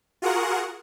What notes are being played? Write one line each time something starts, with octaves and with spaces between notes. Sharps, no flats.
F4 F#4 G#4 A#4 F#5